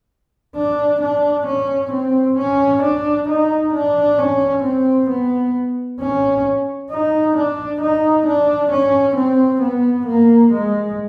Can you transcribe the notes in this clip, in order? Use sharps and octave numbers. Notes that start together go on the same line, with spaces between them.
D4
D4
C#4
C4
C#4
D4
D#4
D4
C#4
C4
B3
C#4
D#4
D4
D#4
D4
C#4
C4
B3
A#3
G#3